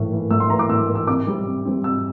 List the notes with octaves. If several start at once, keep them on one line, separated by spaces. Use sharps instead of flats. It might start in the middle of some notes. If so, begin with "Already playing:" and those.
Already playing: A2 E3 A#3
E3 A#3
A2 E6
C6
E3 A#3 A#5
D6
A2 E6
E3 A#3
E6
C3 D6
G3 C4
C3
G3 C4
C3 E6